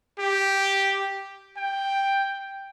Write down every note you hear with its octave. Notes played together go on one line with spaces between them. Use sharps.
G4
G5